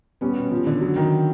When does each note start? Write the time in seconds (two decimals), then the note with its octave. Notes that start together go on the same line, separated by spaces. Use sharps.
0.21 G3 B3 C#4
0.37 B2
0.51 F3
0.66 D3
0.81 F#3
0.96 D#3